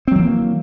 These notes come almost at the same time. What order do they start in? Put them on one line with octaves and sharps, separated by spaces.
C4 F#3 E3 A#3